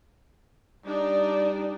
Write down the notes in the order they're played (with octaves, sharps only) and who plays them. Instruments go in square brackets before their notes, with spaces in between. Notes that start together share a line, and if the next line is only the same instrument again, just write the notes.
[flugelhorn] G3 [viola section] D4 D#4 D5